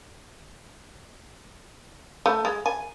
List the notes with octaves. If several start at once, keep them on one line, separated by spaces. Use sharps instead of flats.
A3
G#3
G#5